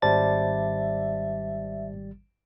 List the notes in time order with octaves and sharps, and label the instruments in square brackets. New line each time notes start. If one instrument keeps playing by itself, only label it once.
[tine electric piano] G#1 G3 A6 [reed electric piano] C5 D5 A5 [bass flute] E5